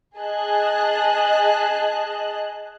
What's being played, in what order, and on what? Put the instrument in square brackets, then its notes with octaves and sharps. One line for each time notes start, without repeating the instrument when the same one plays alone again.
[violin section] G#4 D#5 A5 F#6